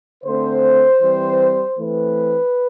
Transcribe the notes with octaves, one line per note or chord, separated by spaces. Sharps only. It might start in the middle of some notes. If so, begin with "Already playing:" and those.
D3 A3 C4 C5
E3 G3 C4
E3 A3 C4 B4